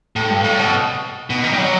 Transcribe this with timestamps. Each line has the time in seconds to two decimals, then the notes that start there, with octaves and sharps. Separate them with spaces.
0.16 A2
0.30 G2
0.44 A2
0.59 B2
1.30 B2
1.43 D#3
1.52 G3
1.58 F#3